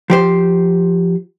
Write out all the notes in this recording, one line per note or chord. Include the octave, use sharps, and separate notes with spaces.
F3 G4 C5